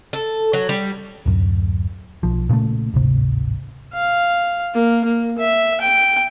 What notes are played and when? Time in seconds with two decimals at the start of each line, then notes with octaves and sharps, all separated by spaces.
0.13 A4
0.53 F#3
0.69 G3
1.26 D1 F#2
2.23 B1 F3
2.49 A#2 C#3 G#3 A3
2.94 D1 G#1 C3
3.93 F5
4.74 A#3
5.04 A#3
5.38 E5
5.81 G5